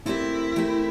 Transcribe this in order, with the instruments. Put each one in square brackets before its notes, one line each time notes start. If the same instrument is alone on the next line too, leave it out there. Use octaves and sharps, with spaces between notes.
[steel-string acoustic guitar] A3 C4 G4 A#4 E5 [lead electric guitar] E4
[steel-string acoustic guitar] A3 C4 G4 A#4 E5